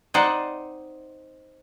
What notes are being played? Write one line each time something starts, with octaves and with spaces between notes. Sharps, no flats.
C4 D#4 C5 D5 D#5 F#5